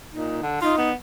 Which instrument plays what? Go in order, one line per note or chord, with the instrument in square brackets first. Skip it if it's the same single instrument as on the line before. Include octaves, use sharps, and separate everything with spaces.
[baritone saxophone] A#2 [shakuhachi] D#4
[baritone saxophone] D3
[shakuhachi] D#4 [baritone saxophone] F4
[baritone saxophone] B3